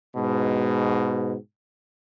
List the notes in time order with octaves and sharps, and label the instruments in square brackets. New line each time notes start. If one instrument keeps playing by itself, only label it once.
[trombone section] G#2 B2